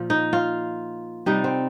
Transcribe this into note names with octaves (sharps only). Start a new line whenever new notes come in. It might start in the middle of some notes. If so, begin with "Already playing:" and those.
Already playing: A#2 F3
D#4
F4
C3 G3 D#4
C4